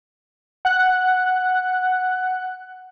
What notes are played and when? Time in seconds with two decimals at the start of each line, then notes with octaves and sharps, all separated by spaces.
0.65 F#5 F#6